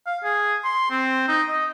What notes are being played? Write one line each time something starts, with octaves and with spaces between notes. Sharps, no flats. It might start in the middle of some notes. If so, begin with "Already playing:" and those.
F5
G#4
C6
C4
D#4
D#5